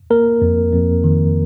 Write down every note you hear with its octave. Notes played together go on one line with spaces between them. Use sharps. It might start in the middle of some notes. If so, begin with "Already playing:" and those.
A#3 A#4
F2
F2
D#3